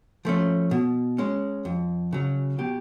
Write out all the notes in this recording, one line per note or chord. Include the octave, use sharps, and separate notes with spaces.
F3 A3 C#4
B2
G#3 C#4
F2
C#3 F#3
B2 G4